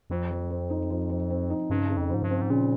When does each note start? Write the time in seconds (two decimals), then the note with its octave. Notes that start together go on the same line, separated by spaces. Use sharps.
0.10 F2 F3
0.31 F3
0.50 C4
0.70 D#4
0.90 F3
1.10 F3
1.30 C4
1.50 D#4
1.70 G2 C#3
1.90 C#3
1.97 F2
2.10 G#2 F3
2.23 G2
2.31 C4
2.42 G#2
2.50 A#2 C#3